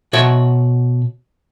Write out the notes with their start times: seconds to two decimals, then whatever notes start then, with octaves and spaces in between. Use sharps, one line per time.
0.13 B2 F#4 C#5 E5